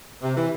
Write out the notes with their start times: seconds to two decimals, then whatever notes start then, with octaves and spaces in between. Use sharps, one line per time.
0.22 C3
0.36 E3